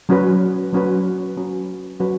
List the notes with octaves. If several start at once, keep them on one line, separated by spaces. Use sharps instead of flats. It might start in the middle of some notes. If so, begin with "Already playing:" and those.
F#3 C#4 F#4 B4
F#3 C#4 F#4 B4
F#3 C#4 F#4 B4
F#3 C#4 F#4 B4